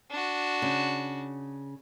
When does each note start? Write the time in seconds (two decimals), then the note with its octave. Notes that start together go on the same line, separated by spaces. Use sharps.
0.11 D4 F#4
0.62 C#3